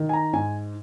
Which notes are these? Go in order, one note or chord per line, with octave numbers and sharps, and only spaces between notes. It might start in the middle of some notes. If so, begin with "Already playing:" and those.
Already playing: D#3
G#5
A#5
G#2 G#5